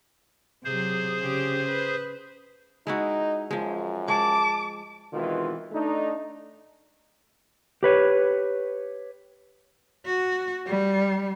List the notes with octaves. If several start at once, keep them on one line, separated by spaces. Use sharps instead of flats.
C3 F#3 G#4 C5
C#3 G4
B4
G#3 D#4 E4 F#4
F#2 F3 G#3
G#3 A5 D6
B2 D#3 E3 G#3 C4 F4
A3 D4 D#4
G4 B4 C#5
F#4
G3